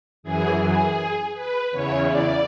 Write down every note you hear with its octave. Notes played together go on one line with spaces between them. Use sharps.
F#2 E3 G#4
G#4
B4
E2 C#3 E3 C#5
D5